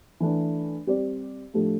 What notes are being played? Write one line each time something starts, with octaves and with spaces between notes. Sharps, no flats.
E3 A3 D4
G3 C4 G4 D5
A2 F3 A3 D4 G4